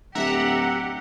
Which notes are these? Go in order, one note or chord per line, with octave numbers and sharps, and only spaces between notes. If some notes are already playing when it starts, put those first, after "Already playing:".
D1 G4 E5 F#5 A#5